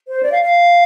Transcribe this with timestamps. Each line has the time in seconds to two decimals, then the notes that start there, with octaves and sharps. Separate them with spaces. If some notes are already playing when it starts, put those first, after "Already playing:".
0.08 C5
0.23 D5
0.32 F5
0.42 F5